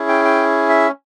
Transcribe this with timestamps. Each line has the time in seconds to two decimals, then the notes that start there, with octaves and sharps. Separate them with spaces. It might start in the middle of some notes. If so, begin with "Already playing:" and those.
Already playing: C#4 E4 G#4
0.09 G5
0.25 G5
0.69 E5